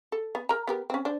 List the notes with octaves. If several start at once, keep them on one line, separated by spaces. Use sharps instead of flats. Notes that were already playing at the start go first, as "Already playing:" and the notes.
A4
B3
A#4 A#5
B3 G4 A#4
C4 C#4
D4 C5